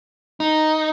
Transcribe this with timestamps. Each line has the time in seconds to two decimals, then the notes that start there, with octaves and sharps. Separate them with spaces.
0.40 D#4